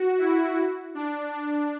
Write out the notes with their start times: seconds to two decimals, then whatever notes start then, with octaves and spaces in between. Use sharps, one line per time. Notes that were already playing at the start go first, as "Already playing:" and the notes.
Already playing: F#4
0.18 E4
0.95 D4
1.33 D4